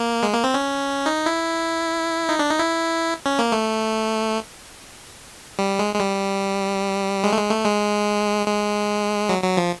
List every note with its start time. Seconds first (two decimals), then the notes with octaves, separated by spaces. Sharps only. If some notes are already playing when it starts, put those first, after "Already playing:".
Already playing: A#3
0.23 G#3
0.33 A#3
0.44 C4
0.54 C#4
1.06 D#4
1.26 E4
2.29 D#4
2.39 D4
2.50 D#4
2.59 E4
3.26 C#4
3.39 A#3
3.52 A3
5.59 G3
5.79 G#3
5.95 G#3
6.00 G3
7.24 G#3
7.33 A3
7.37 G#3
7.51 A3
7.65 G#3
8.47 G#3
9.29 F#3
9.43 F#3
9.57 F3